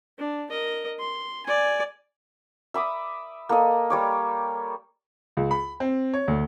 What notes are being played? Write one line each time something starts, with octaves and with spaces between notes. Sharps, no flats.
D4
A#4 D#5
C6
D5 G#5
E5 B5 D6 D#6
A#3 A4 D#5
G3 C#5 D6
C#2
B5
C4
C#5
D2